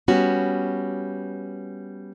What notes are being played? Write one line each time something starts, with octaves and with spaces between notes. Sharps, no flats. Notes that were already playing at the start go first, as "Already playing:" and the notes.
G3 B3 C#4 F#4